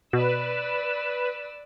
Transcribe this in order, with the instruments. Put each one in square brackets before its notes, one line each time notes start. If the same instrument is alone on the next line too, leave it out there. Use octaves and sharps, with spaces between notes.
[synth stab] B2 [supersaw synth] B4 [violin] D5 E6